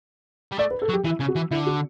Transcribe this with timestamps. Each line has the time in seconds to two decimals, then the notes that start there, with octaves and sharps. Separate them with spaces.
0.52 G3
0.59 A3 D5
0.71 B4
0.82 A4
0.89 F#3
0.93 G4
1.04 E3 E4
1.20 C#3
1.28 F#4
1.35 E3
1.51 D3 E4
1.66 F#4